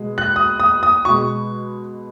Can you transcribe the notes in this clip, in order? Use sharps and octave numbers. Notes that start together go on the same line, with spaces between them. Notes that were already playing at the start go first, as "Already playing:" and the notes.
Already playing: B2 G#3
F#6
D#6
D#6
D#6
B2 G#3 C#6